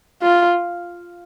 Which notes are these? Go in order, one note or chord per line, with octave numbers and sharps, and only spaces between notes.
F4